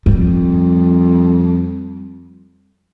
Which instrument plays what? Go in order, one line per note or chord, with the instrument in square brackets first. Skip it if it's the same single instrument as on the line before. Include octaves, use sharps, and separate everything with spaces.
[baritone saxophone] F2 [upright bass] G3